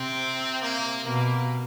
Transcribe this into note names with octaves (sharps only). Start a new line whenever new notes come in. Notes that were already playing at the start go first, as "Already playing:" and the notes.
Already playing: C3 C4
A#3
B2 A#3